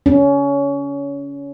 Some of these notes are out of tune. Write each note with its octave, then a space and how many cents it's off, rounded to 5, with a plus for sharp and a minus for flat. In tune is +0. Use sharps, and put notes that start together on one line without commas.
C#4 +25